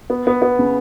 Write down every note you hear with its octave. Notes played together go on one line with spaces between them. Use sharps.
B3
B3
B3
C#3